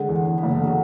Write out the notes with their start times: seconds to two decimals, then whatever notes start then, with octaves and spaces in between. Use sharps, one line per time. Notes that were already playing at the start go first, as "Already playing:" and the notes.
Already playing: D3 G#3 B3
0.09 E2
0.25 E2 C#4
0.38 B3
0.43 F#1
0.51 A3
0.60 D3 F#3